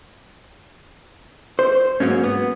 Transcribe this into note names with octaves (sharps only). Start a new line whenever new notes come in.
C5
G#2 F#3 A#3 C#4
B3